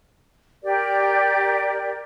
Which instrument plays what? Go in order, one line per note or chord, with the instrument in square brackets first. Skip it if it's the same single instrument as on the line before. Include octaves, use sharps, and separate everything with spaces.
[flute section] G4 A#4 D5